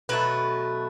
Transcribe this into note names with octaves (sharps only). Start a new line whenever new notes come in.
B2 F#3 A3 B4